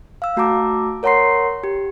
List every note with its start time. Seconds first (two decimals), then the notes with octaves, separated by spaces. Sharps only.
0.22 F5 E6
0.37 A3 F#4 A5 A#5 D6 E6
1.03 A#4 C#5 F#5 A#5 C6 C7
1.64 G4